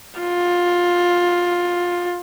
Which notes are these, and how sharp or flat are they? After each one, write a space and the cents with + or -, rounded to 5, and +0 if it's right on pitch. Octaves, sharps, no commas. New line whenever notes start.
F4 +15